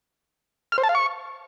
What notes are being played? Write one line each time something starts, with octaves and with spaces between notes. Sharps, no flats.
F6
C5
A5
F5
C#6